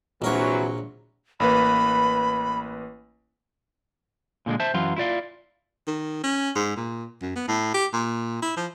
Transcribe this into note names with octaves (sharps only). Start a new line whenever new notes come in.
A#1 C3 E3 F#3 A#4 C#5
A1 A#3 B4 B5
A#2 D3 G3 G#3
C5 E5 A5
F#2 E3 F#3 F5 C6
E4 F4 D5 F5
D#3
C#4
G#2
A#2
F#2
B3
A2
G4
A#2
E4
F3